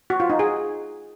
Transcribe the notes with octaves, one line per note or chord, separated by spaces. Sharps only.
F#4
F4
D#4
G#4